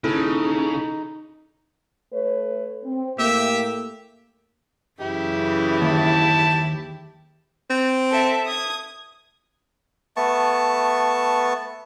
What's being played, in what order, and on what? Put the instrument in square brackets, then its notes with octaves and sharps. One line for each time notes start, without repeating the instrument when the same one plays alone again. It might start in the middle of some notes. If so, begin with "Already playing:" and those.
[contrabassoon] D#1 [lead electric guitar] C#3 [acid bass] D#4 [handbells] E4 A4
[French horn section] A3 B4 C#5
C4
[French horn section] A2 A3 A#3 [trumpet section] G4 E5
[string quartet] F#2 C#3 E3 [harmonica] E4 G4
[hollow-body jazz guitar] D#2 [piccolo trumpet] A5
[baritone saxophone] C4
[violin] A4 E5
D#6 G#6
[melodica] A3 B3 A5 C#6